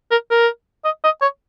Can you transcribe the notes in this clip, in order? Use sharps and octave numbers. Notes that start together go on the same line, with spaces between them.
A#4
A#4
D#5
D#5
C#5